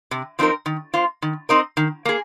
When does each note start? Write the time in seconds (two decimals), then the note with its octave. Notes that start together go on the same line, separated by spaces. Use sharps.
0.11 C3
0.39 F3 C4 D#4 A#4
0.66 D#3
0.94 A#3 F4 C5
1.22 D#3
1.49 C4 D#4 A#4 D#5
1.77 D#3
2.05 A#3 G#4